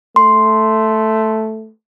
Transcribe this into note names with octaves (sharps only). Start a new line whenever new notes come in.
A3 C6